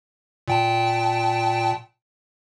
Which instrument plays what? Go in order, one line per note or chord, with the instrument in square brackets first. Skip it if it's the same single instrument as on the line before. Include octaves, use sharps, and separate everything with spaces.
[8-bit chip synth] A#2 G5 A5